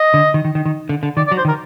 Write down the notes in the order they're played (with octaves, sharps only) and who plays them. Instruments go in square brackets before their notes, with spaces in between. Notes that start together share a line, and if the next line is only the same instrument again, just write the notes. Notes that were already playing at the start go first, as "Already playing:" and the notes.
Already playing: [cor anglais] D#5
[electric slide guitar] D3
D#3
D#3
D#3
D#3
D3
D3
[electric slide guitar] D#3 [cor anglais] D5
[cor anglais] D5
[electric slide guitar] F#3
[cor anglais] C5
[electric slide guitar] D#3
[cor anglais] A#4